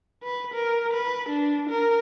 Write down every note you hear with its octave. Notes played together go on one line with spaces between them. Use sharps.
B4
A#4
B4
D4
A#4